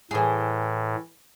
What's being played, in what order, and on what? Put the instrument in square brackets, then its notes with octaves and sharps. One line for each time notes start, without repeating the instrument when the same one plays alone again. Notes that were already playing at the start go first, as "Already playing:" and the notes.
[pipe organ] A2 [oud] E3 G#4